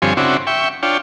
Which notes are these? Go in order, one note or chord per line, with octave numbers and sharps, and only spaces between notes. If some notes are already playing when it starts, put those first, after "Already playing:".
G2 D3 F3 C4 C#5 G#5
C#3 C4 D4 E4 F#4
E5 G5 C#6
D4 F4 C#5 G5